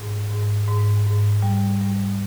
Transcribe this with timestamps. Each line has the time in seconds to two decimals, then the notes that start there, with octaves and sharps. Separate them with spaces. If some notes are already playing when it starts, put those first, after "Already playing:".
Already playing: G#2
0.31 G#2
0.68 G#2
1.06 G#2
1.42 G3
1.81 G3